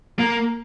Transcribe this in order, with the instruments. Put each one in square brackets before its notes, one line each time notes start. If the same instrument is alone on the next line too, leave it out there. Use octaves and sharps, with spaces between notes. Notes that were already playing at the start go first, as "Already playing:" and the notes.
[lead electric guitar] A#3